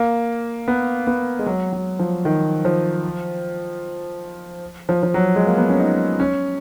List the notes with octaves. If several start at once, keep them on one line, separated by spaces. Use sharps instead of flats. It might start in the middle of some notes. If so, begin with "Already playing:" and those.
Already playing: A#3
B3
B3
G#3
F#3
F#3
F3
D#3
F3
F3
F3
F#3
G#3
A#3
B3
C#4
D#4
C#4